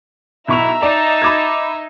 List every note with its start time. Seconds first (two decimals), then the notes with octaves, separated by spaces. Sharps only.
0.48 B1 E4 E5 A#5 C#6 F7
0.83 D#4 D5 A5
1.22 B5 D6 G#6